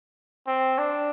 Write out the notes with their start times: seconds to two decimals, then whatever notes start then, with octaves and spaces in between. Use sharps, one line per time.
0.47 C4
0.78 D4